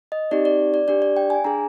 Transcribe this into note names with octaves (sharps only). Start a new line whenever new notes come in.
D#5
C4 D#4 G4 D5
D5
D5
D4 G4 D5
D5
G5
G#5
D4 G#4 A#5